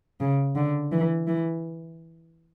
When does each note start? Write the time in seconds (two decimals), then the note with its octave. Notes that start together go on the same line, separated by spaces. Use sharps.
0.21 C#3
0.56 D3
0.92 E3
1.28 E3